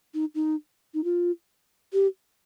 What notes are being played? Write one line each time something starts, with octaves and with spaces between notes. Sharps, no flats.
D#4
D#4
D#4
F4
G4